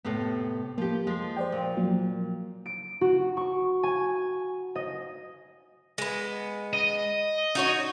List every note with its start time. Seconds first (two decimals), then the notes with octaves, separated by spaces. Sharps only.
0.05 A2 C3 B3
0.78 F3 A#3 G4
1.07 F3 G#3
1.37 C5 D5 G5
1.52 A#2
1.76 F3 F#3 A#3
2.66 D7
3.01 F#4
3.37 C#6
3.83 G#5
4.75 D#5
5.98 G#3 B3
6.73 D#5
7.55 D#4 F#4 C#5